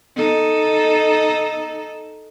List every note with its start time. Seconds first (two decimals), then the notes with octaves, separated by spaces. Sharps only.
0.16 D#4 A4